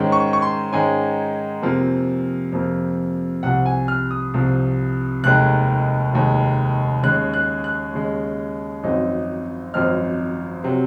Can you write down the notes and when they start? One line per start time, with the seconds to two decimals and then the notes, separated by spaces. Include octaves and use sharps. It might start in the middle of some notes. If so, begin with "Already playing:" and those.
Already playing: G#2 D#3 G#3 C#4
0.12 C#6
0.33 C#6
0.42 C6
0.72 G#2 D#3 G#3 C#4 G#5
1.62 F2 C3 F3 A#3
2.52 F2 C3 F3 A#3
3.43 C2 C3 F3 F#5
3.66 G#5
3.88 F6
4.11 D#6
4.34 C2 C3 F3
5.24 F1 D#2 D#3 G#3 F#6
6.13 F1 D#2 D#3 G#3
7.03 D#2 C#3 G#3 F#6
7.34 F#6
7.64 F#6
7.94 D#2 C#3 G#3
8.84 G#1 F#2 F3 C4 D#4
9.74 G#1 F#2 F3 C4 D#4 F6
10.64 C3 F#3 C4